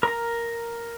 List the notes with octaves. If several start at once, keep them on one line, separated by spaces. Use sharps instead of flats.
A#4 A#5